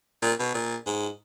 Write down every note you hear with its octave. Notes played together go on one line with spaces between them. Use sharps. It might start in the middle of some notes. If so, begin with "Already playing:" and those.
A#2
B2
A#2
G#2